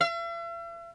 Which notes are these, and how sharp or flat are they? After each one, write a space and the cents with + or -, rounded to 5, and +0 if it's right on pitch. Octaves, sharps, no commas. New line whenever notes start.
E5 +45